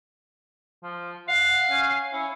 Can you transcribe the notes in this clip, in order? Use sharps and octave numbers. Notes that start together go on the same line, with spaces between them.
F3
F5 F#5
C#4
C#4 E4